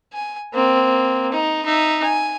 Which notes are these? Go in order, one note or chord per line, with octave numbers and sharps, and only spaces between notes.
G#5
A#3 C4
D#4
D#4 E5
G#5